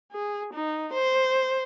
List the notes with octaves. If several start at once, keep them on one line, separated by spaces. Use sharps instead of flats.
G#4
D#4
C5